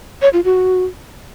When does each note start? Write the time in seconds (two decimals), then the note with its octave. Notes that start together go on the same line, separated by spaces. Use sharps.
0.22 C#5
0.33 F4
0.45 F#4